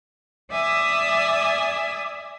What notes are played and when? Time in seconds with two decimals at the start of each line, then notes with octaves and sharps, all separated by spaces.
0.50 D5 E5 G#5 D#6 E6